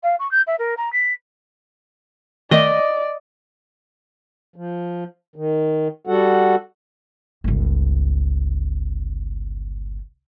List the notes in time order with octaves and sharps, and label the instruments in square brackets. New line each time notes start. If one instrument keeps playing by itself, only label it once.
[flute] F5
C#6
G6
E5
A#4
A#5
B6
[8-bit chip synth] D#3 A3 [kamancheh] D5 [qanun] D#5
[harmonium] F3
D#3
G3 F#4 A4 F#5
[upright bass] G1 C#2